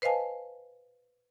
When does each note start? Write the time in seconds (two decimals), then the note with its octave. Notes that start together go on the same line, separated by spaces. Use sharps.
0.02 B4 C5 D#5 F5 G#5 A5